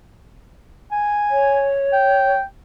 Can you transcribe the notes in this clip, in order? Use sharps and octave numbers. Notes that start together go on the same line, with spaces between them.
G#5
C#5
G5